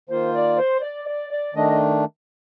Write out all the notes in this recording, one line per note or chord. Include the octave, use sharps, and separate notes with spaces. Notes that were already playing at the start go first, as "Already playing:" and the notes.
D#3 A#3 F4 C5
D5
C5
D5
D5
D5
D#3 A3 D4 D#5
D#5